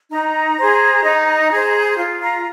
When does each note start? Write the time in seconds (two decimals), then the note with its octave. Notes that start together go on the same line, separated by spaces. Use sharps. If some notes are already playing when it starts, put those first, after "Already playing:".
0.11 D#4 A#5
0.58 G#4 C5
1.05 D#4
1.51 G#4 C5
1.99 F4
2.22 A#5